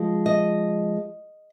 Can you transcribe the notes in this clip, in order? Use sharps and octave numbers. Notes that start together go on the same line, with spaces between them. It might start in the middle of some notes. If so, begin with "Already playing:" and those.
Already playing: F3 G#3
D#5